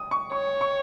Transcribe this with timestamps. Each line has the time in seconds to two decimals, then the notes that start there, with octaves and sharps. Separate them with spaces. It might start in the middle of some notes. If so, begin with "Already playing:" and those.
Already playing: D#6
0.11 C#6
0.32 C#5 C#6
0.61 C#6